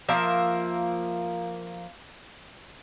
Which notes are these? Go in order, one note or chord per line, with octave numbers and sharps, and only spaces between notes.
F3 A#3 E5